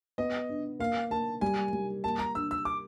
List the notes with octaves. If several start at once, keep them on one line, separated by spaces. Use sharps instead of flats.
B3 D#5
D4
A#3 F5
A#3 A5
G3 G#5
G3
A#3 A5
A#5
D4 E6
E6
D6